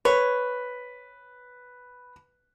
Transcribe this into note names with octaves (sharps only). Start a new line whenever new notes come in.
B4 C#5